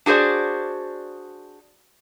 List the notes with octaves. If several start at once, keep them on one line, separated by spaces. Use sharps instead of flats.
D4 F#4 G#4 C5 D5